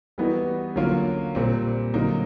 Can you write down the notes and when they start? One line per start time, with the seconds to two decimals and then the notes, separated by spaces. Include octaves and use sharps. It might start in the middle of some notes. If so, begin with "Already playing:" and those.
0.18 E3 G3 B3 D#4 F#4
0.76 D3 F#3 A#3 C#4 F4
1.35 A#2 G3 C4
1.93 D3 F#3 A#3 D#4